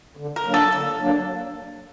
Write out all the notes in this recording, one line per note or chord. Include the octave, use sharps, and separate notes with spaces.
D3
A#4
F#3 A#3 D4
A4
D3 A4
F#3 A#3 D4